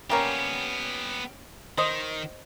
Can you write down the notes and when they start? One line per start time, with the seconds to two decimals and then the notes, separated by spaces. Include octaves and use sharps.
0.10 G3 A#3 B3 C#4 G4
1.78 D#3 C5 D#5